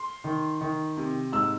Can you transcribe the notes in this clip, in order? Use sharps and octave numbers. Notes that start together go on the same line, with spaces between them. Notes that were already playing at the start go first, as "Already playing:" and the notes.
Already playing: C6
D#3
D#3
C3
G#2 E6